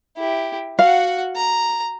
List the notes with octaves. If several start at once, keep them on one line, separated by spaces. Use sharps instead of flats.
E4 G4
F#4 F5 F#5
A#5